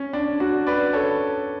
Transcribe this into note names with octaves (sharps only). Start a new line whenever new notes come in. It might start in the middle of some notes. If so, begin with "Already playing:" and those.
Already playing: C#4
D4
D4 F#4
B4 D5
A4 C#5